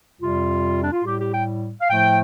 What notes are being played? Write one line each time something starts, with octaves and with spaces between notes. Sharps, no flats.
F2 C3 G3 F4
D4
F4
A2 G3 G4
G4
G5
F5
A2 F3 A3 G5